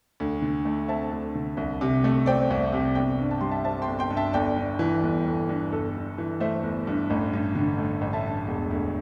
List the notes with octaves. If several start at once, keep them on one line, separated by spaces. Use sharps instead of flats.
D2
D3
A3
C4 E5 A5
D2
D3
C2
C3
A3
C4 D5 G5
C2
C3
G1 D5 G5
G2
A5
G3 C6
E5 A5
C4 E5 A5
G5 C6
G1
G5 C6
G2
E5 A5
G1 D5 G5
G2
E3
G1
G1
G2
G1 A4
G2
E3
A3 C5 E5
G1
G2
A1
G2
D3
A3
A1
E5 A5
G2
E1
D2